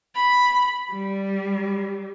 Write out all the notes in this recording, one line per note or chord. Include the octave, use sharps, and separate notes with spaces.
B5
G3